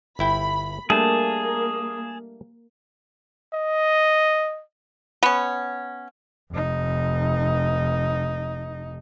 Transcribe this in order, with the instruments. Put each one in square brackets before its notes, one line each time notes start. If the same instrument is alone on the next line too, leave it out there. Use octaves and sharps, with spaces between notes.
[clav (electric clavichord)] G1 E4 G5 [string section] B5
[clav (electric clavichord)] G3 A3 D4 [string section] A#3 [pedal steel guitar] G#4 A5
[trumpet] D#5
[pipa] B3 C#4
[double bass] F1 D#4